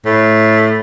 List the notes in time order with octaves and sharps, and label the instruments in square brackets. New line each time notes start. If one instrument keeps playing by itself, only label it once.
[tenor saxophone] A2